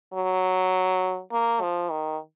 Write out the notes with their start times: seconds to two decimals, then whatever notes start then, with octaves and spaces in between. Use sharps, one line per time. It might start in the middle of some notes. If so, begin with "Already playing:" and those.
0.14 F#3
1.32 A#3
1.61 F3
1.91 D#3